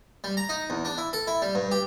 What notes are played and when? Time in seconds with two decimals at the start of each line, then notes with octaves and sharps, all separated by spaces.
0.24 G3
0.37 A#5
0.49 D#4
0.70 E2
0.85 D4
0.98 E4
1.13 A4
1.27 E4
1.42 G3
1.55 G2
1.71 G4